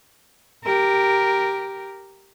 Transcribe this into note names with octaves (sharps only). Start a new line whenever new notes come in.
G4 A#4